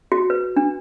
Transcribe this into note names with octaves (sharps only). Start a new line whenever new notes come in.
F#4
B4
D4